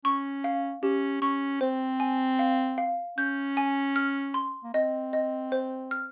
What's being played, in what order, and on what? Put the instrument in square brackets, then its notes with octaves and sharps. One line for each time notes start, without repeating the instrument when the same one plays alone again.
[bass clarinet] C#4 [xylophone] C#6
[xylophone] F5
[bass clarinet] C#4 [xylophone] G4
[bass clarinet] C#4 [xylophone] C#6
[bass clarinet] C4 [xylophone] C5
[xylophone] G#5
F5
F5
[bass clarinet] C#4 [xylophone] G6
[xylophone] G#5
F6
C6
[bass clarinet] A#3
[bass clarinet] C4 [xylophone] D#5
[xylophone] D#5
C5
F6